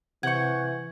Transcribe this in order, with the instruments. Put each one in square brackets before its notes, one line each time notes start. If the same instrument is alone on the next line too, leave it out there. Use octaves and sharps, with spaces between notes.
[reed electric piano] C3 G6 [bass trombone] E3 [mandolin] F#5 C#6 [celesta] G#6